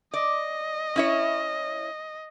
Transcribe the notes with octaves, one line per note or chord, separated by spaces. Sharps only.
D5 D#5
C#4 E4 C#5